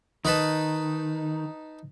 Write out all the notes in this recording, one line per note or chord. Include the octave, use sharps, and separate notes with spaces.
D#3 D#4 B4 A5